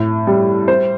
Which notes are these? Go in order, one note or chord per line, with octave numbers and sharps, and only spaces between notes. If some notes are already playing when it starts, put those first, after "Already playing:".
Already playing: A2
G3
C5